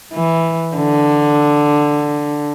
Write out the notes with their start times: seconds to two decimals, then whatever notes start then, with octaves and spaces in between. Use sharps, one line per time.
0.13 E3
0.77 D3